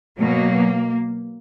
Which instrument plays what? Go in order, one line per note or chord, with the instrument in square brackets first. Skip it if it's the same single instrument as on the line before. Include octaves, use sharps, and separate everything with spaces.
[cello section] B2 F#3 A#3